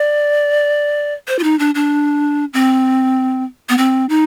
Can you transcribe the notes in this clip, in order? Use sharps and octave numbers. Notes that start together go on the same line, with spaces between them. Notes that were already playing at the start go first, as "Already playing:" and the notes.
Already playing: D5
C5
F4
D#4
D4
D4
C4
B3
C4
D#4